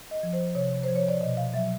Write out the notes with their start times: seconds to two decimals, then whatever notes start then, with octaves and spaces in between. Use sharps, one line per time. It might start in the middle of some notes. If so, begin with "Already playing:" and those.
0.11 D#5
0.23 F3
0.33 C5
0.55 C3 C#5
0.83 F3 C5
0.96 C#5
1.09 D5
1.21 B2 D#5
1.37 F5
1.54 F#3 E5